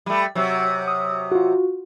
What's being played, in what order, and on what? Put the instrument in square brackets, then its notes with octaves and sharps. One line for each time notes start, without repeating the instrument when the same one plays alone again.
[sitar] G3 A3
C3 F#3
[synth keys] D#6
F4 F#4